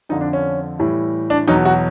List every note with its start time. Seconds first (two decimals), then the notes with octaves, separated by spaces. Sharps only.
0.09 F2 D3 F3 D#4
0.21 D4
0.33 C#4
0.79 A2 E3 G3
1.30 D4
1.47 E2 B2 F#3 D#4
1.65 F#4